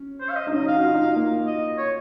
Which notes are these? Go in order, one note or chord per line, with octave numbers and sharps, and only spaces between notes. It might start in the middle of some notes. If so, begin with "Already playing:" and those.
Already playing: C#4
C5
F5
D#5
D#4
C#4 D#5
D#4
F5
F#4
F4
D#4
A#3
D#5
C#5